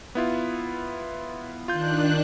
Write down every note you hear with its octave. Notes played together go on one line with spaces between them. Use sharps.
B3 E4 F4
D#3 D4 F4 F#6 G6